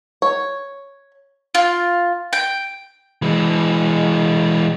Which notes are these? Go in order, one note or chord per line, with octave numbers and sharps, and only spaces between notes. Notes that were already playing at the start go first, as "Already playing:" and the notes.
C#5
F4
G5
E3 G#3